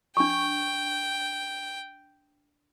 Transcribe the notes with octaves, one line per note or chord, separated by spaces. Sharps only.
D4 G5 C#6